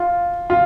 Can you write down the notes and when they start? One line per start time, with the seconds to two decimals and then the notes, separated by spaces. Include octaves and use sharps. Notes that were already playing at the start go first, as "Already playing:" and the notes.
Already playing: F4
0.50 F4